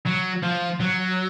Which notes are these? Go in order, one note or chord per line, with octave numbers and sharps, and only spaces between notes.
F#3
F3
F#3